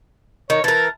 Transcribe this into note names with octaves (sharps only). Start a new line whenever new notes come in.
D#3 C#5
E3 A#4 A5